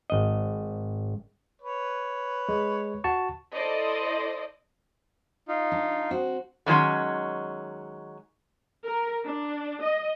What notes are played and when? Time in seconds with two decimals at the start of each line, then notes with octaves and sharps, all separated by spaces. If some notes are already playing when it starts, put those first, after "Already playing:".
0.10 G#1 D#5
1.62 B4 C#5
2.49 G#3
3.04 F#4 A5 C#6
3.54 E4 A4 C5 D5 D#5
5.48 D#4 F4
5.72 D4
6.11 C4 F#4
6.66 D3 D#3 F#3 G#3 C#4
8.85 A#4
9.25 D4
9.82 D#5